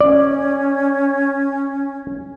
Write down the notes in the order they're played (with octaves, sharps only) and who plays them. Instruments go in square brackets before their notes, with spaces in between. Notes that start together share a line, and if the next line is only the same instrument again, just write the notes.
[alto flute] C#4 [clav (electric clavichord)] D5